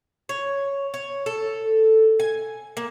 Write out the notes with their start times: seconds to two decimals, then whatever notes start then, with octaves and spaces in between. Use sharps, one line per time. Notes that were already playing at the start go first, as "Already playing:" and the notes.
0.29 C#5
0.94 C#5
1.26 A4
2.20 G#5
2.77 A#3